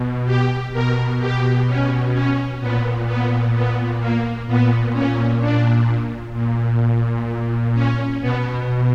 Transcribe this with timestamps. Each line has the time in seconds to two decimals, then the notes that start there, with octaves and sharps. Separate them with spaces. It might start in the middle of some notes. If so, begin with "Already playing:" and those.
Already playing: B2
0.26 G4
0.72 B2 A#4
1.20 G4
1.67 C#4
2.13 C#4
2.60 A#2 B3
3.07 B3
3.54 B3
4.00 A#3
4.47 A#2 B3
4.93 C#4
5.40 D4
6.34 A#2
7.74 C#4
8.21 B2 B3